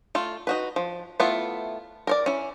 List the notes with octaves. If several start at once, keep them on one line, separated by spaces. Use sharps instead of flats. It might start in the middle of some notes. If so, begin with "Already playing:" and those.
A3 F4
D#4 F#4 B4
F3
A3 B3 E4 F4
A#4 C#5 D5
C#4 E4